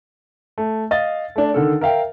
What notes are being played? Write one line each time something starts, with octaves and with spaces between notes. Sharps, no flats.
A3
D#5 F5 A6
A3 D4
D3 D#3 A4
A#4 E5 F5 G5